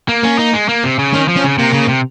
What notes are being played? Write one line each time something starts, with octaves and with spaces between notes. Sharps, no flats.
A#3
A#3 C#4
D#4
G#3
A#3
C3
C#3
D#3 C#4
F3
C#4
C#3
C3 A#3
C#3
C3